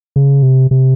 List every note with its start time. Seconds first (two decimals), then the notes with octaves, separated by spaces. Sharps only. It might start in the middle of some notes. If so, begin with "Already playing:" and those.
0.16 C#3
0.43 C3
0.71 C3